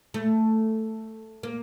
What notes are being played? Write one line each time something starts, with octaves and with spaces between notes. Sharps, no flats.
A3
A#3